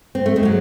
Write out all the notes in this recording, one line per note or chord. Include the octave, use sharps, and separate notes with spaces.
C4
A3
G#3 C4
D#3 F#3